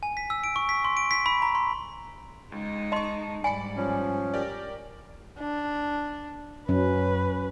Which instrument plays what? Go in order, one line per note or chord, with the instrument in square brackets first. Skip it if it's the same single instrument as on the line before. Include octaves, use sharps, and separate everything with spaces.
[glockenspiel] G#5
B6
E6
D7
C#6
B6
C6
D7
B6
B5
A#5
C6
[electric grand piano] C#2 [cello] G#3 D#4
[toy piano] D#5 C6 [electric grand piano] A5 C#6
[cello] G#2 G3 [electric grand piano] D5 B5 C#7 [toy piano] G#5
[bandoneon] F3 C#4
[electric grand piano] G4 A#4 D5
[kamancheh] D4
[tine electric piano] F#2 [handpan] F#3 C#4 [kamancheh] B4